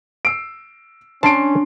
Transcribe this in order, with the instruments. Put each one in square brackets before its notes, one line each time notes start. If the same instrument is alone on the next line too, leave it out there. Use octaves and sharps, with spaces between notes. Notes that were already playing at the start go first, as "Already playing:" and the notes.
[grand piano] E6 C7 D7
[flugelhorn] C#4 [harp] D4 [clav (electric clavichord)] A5 [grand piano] C6 C7 D7